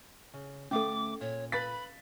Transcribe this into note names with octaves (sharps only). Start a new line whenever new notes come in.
C#3
D2 A3 C#4 A4 F5 D6
A#2 C#5
B4 F5 B5 A6 B6